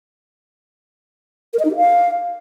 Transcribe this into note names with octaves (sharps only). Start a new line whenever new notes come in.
A#4
D#5
D#4
G4
F5